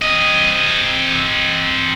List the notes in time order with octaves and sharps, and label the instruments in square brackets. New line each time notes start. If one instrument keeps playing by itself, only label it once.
[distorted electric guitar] C4 D#5